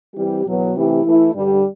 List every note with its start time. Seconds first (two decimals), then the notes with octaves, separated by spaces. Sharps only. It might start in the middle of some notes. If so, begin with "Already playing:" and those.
0.15 E3 G3 C4 G4
0.44 E2 B2 F#3 B3
0.73 C3 E3 A3 E4 G4
1.03 E3 A3 E4
1.32 G2 D3 G3